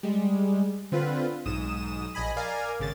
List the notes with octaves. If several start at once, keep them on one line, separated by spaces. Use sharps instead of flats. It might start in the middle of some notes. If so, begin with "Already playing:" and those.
G3 G#3
D3 C4 F4 B4
B1 G#2 D#6 E7
A#1 D#5 G#5 B5
A#4 D5 F5 G#5
G#1 C#3 A6